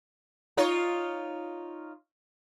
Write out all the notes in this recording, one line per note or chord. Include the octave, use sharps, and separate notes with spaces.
D#4 F4 C#5